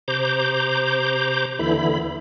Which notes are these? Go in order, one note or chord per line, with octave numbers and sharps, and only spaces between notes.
C3 C5 A#5 D6 G6
D#2 D3 E3 E4 B5